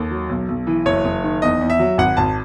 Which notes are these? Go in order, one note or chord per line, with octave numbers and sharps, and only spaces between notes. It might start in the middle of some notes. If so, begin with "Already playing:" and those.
Already playing: D#2 A4
F#3
B1
B1
E3
F#1 C#5
F#1
D#3
E2 D#5
E2
E5
F#3
G#1 F#5
G#1 A5